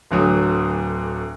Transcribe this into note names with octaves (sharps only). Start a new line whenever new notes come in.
D1 D2 F#3 D#6